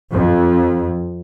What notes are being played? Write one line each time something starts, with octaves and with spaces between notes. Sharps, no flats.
F2